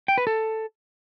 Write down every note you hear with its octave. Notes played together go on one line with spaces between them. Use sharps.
G5
B4
A4